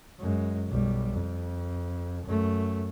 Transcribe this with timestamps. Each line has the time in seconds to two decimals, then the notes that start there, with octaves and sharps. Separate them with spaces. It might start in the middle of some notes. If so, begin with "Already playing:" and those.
0.20 F#2 G#3
0.69 B1 G3
1.13 F2
2.24 F#2 A3